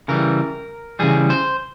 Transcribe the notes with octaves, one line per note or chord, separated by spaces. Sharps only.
C#3 E3 G3 A#4
C#3 E3 G3 G#4
C5